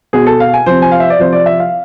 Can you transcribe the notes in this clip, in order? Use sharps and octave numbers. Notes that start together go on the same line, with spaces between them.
B2 G#4
A4
F5
G#5
C3 F3 C5
G#5
F5
E5
D5
C3 F3 C5
D5
E5
F5